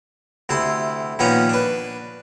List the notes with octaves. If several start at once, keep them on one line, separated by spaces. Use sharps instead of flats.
D2 C3 E4 C6
A#2 D#3 F3 B3 C#4 A#5
D4 B4